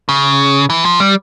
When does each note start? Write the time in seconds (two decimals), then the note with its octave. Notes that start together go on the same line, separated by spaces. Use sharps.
0.09 C#3
0.70 E3
0.85 F3
1.00 G3